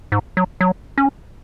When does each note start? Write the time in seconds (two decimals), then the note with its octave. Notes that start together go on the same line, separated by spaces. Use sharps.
0.12 G#2
0.37 F#3
0.61 F#3
0.98 C#4